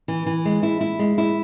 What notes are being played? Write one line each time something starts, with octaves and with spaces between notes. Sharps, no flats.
E3
E3
G#3
E4
E4
G#3
E4